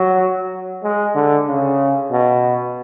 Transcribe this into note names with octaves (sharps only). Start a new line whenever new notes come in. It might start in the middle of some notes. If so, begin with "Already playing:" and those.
Already playing: F#3
G#3
D3
C#3
B2